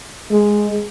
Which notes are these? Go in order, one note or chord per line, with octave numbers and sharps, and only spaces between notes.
G#3